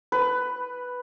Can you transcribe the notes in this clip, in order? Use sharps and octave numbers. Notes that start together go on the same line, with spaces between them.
B4